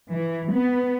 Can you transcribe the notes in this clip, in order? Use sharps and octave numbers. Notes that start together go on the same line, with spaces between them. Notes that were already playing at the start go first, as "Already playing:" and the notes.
E3
B3